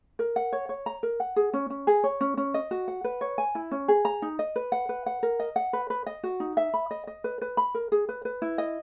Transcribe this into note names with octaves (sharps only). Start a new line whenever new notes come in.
A#4
F#5
C#5
C#5
A#5
A#4
F#5
G#4
C#4
C#4
G#4
C#5
C#4
C#4
D#5
F#4
F#5
B4
C#5
G#5
E4
C#4
G#4
A#5
D#4
D#5
B4
F#5
B4
F#5
A#4
D#5
F#5
B4
B4
D#5
F#4
D#4
E5
B5
D#5
D#5
B4
B4
B5
A#4
G#4
B4
B4
E4
D#5